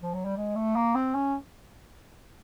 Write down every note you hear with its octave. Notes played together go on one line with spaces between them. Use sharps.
F3
F#3
G3
G#3
A3
A#3
C4
C#4